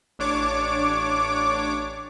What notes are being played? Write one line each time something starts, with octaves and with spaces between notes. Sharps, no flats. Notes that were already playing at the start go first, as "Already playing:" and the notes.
A1 D4 C#5 D6